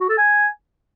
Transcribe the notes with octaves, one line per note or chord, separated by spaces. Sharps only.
F#4
A4
G#5